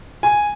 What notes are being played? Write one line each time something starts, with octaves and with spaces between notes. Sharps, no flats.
G#5